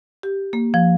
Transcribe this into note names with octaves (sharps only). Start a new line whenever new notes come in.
G4
A#3
F3